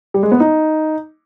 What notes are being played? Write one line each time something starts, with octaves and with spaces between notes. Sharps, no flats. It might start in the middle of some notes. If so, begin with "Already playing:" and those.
G3
G#3
B3
D#4